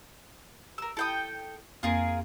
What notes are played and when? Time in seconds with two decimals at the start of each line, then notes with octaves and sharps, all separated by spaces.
0.78 A#4 E6
0.97 E4 A4 G5 B5 D#6
1.83 F2 A#3 C4 F4 G#4 A#4